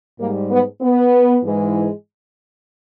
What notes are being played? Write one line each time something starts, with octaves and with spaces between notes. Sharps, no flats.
G#2 G3 A#3
B3
B3
G#2 E3 G#3